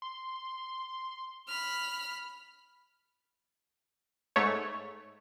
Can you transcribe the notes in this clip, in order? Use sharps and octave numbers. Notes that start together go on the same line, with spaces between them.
C6
B5 F6
G#2 A3 C#5